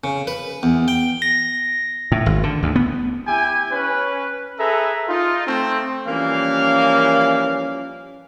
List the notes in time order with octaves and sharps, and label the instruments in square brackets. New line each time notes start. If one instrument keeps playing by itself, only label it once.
[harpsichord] C#3
B4
E2
G5
[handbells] A#6
[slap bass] A2
G#1
D3
D2
B3
[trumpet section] E4 G4 G5 G#5
C#4 B4
G#4 A4 B4 E5 A#5
D#4 F4
A3 C4
[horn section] E3 A#3 [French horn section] F3 G3 C#4 [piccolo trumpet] F5